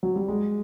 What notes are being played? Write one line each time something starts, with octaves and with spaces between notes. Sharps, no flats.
F#3
G3
G#3